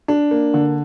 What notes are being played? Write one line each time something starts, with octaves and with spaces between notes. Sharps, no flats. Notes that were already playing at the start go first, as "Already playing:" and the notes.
D4
A#3
D3